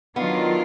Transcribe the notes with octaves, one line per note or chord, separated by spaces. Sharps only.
D#3 F#3 B3 D4 F4